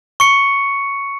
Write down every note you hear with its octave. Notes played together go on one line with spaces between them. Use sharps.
C#6 C#7